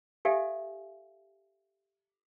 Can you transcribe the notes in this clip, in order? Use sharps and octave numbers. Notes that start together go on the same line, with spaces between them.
G4 A4 D5 E5 F5 G#5